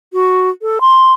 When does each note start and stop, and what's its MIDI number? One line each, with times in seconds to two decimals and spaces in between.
0.13 0.50 66
0.62 0.79 69
0.81 1.13 84